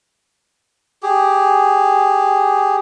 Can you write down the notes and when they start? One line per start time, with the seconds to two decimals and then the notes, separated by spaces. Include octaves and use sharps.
1.03 G4 G#4